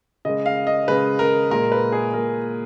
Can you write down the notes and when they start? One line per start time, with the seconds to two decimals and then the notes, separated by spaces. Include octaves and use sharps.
0.25 C#3 G#3 D#5
0.46 F5
0.67 D#5
0.88 C#3 G#3 B4
1.19 A#4
1.51 A#2 G#3 A#4
1.72 B4
1.92 G#4
2.14 A#2 G#3 A#4